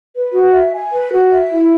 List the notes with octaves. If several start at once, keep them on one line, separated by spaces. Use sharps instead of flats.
B4
F#4
E5
G#5
B4
F#4
E5
E4